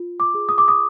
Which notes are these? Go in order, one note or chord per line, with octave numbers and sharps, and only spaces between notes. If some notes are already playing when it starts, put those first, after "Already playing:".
Already playing: F4
D6
G#4
D#6
D6
D#6